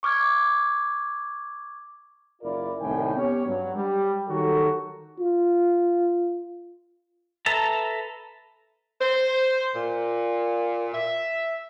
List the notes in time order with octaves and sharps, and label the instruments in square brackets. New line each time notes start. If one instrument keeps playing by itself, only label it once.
[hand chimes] C#6 D6 F6 G#6
[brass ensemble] F#1 E4 F4 A#4 D5
C2 A2 D#3 G5 G#5
B3 C#4 G4 C#5
G2 F#3
G3
D#3 F#3 F#4 G4 A4
[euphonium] F4
[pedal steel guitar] A4 B4 E5 A5 A#5
[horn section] C5
A#2
E5